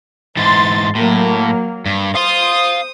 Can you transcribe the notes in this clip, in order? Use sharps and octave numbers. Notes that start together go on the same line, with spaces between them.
G#2 E3 C6 A6
A2 F#3 A#3
G2
C5 F5 C6 D#6